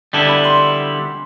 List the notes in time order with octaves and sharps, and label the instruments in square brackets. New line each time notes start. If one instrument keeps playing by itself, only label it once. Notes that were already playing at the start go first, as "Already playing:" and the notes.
[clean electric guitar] D3 G3 B3 E4 [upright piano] A5
[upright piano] B5
C6